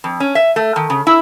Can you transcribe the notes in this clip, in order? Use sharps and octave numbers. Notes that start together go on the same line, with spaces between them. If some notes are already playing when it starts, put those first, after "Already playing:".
F2
C#4
E5
A3
D#3
C#3
E4